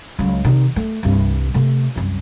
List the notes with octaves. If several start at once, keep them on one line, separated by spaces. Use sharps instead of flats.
C#2 F#3
C3 D#3
A3
C2 G2
C3 A3
C2 F#2